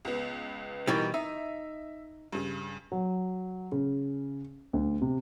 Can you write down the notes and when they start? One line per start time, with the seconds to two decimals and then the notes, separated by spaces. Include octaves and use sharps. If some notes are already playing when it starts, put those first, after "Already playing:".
0.05 C#2 B3
0.87 B2 E3 G3 D#4 A#4
1.14 D#4 E5
2.32 G2 C#3
2.92 F#3
3.72 C#3
4.73 D2
5.02 C3